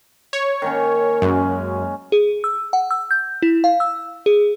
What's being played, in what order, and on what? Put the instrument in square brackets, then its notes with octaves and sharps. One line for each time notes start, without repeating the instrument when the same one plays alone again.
[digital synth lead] C#5
[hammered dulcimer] D#3 A#3 C#4
[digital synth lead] F#2 [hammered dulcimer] C#3 G#3 C#4
[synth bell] G#4
E6
F#5
E6
G6
E4
F5
E6
G#4